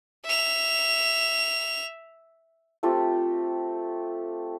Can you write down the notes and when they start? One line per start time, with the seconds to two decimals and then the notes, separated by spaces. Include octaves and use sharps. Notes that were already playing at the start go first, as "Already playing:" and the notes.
0.24 E5 F7
2.83 A3 C4 F4 G4